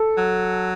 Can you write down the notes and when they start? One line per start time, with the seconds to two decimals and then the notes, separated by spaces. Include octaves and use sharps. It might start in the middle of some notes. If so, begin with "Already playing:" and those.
Already playing: A4
0.18 F#3